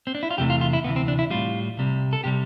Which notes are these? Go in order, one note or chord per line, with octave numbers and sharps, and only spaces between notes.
C4
D4
E4
F4
E2 C3 E3 A3 G4
F4
F4
E4
D2 C3 E3 B3
C4
D4
E4
A2 G3 F4
C2 C3 G3
A4
C3 G3 G4